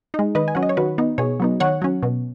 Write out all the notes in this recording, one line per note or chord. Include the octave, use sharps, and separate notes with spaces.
G#3 D#4
D#3 B4 D#5
G#5
F#3 C#4 F#5
D#5
C#5
D#3 F#4 B4
B3 D#4
B2 G#4 C#5
F#3 B3 D#4
D#3 C#5 F#5
F#3 C#4
B2